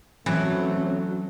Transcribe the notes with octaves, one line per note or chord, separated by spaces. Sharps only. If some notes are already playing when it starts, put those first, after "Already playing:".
E3 F#3 A3 C4 C#4